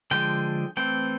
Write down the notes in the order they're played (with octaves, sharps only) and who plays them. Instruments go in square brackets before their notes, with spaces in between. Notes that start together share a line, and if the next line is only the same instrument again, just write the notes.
[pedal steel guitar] D3 F3 G#3 G5
E3 A3 C4 G5